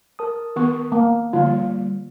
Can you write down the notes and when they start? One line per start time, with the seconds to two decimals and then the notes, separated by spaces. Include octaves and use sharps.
0.19 A#4 A5 D#6
0.56 D#3 B3 C#6
0.92 A#3
1.33 D3 F3 G3 A#3 F4